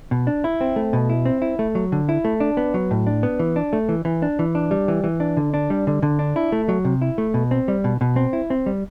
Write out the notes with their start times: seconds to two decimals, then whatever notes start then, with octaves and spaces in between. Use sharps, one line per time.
0.11 B2
0.27 D4
0.44 E4
0.61 C4
0.76 A3
0.93 B2
1.10 E4
1.25 C4
1.42 E4
1.59 A3
1.75 F#3
1.92 D3
2.09 E4
2.25 A3
2.40 D4
2.57 B3
2.74 F#3
2.91 A2
3.07 D4
3.23 B3
3.39 E3
3.56 D4
3.73 A3
3.89 E3
4.05 E3
4.22 D4
4.39 E3
4.55 D4
4.71 G3
4.88 E3
5.04 E3
5.20 D4
5.37 D3
5.54 D4
5.70 G3
5.87 D3
6.02 D3
6.19 D4
6.36 E4
6.52 A3
6.69 F#3
6.85 C3
7.02 E4
7.18 A3
7.34 B2
7.51 C4
7.68 G3
7.84 B2
8.01 B2
8.16 C4
8.33 E4
8.50 C4
8.66 G3